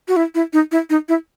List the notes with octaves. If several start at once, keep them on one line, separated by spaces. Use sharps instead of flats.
F#4
E4
E4
D#4
E4
D#4
E4